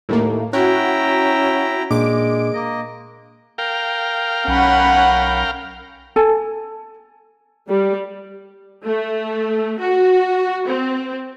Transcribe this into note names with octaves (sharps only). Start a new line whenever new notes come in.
D#2 A2 A3 A#3
C#4 E4 F#4 G5 A#5
A#2 G#3 A#3 D4 D6 D7
A#3 D#5
A#4 F5 G5
B1 C#4 F#5 B5
A4 G#5 A5
G3
A3
F#4
C4